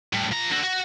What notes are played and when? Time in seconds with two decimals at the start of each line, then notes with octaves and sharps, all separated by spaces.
0.13 A2 G3
0.31 F3 A#5
0.51 D3 F#4
0.63 F#4